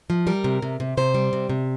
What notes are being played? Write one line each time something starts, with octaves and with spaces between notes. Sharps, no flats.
F3
G3 A#4
C3
C3
C3
C3 C5
G3
C3
C3